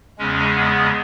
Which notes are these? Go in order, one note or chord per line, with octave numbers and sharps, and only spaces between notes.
E2 C#3 G#3 C#4
B3